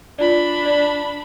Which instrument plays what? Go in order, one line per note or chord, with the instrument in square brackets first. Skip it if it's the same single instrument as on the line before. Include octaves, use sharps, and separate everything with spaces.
[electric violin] D4 B5 [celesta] F4 D5
[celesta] D5